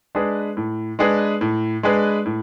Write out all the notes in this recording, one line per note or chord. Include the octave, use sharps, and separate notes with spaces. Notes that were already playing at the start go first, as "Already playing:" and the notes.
G#3 D4 G#4 B4
A2
G#3 D4 G#4 B4
A2
G#3 D4 G#4 B4
A2